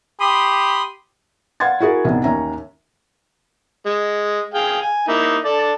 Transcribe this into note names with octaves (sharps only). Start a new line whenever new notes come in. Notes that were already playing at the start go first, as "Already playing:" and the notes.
G4 B5 C6 D#6
B4 F5 F#5 C6 G#6 A6
E4 F#4 G#4 A#4
C2 G#2 B3
D#2 C#4 E5 A#5
G#3
G#4 F5 G5
G#5
A#3 D#4 E4
A4 D5 A5